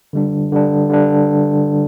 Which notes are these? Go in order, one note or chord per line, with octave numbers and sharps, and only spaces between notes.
D3 G3 D4
D3 G3 D4
D3 G3 D4